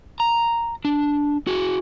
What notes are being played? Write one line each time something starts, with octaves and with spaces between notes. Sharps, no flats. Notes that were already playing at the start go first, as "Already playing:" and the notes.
A#5
D4
F#4 G#4